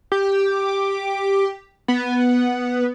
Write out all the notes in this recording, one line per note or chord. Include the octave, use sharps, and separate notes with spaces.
G4
B3